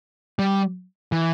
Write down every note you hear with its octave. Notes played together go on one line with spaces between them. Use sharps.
G3
E3